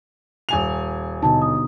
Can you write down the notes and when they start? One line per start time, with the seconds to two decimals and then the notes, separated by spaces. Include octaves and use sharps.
0.49 D#1 G#5 F7
1.23 B2 D3 D#4 A5
1.42 D#6